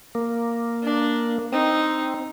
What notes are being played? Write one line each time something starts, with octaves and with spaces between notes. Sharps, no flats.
A#3
D4
C4 D#4